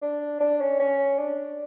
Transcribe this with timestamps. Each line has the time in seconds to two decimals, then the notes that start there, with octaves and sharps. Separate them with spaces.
0.02 D4
0.40 D4
0.61 C#4
0.80 C#4
1.19 D4